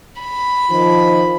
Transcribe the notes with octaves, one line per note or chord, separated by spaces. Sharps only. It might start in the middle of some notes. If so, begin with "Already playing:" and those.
B5
D#3 F3